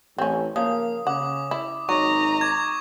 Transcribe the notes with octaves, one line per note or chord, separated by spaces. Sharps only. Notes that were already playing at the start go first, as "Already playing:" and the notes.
A1 C4 C#4
C#3 F3 A#3 D#6
C#3 F#5 D6
E4
G#1 F#3 D#4 A#5 C#6
D6 G#6